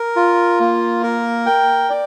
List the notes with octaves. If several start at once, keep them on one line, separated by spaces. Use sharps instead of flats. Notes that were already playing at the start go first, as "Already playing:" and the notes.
Already playing: A#4
F4
A#3
A#4
G5
D5